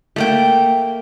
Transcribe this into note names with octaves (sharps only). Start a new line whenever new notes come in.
A3 A#3 G5